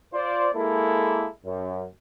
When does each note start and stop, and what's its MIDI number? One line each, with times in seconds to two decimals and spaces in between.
0.14 0.48 65
0.14 0.48 72
0.14 0.48 74
0.54 1.26 56
0.54 1.26 58
0.54 1.26 64
0.54 1.26 69
1.45 1.84 42